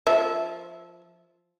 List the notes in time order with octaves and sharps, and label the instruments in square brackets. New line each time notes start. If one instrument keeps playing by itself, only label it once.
[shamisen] F3 E5